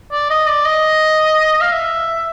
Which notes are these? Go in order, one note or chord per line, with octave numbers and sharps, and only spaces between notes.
D5
D#5
D5
D#5
F5
E5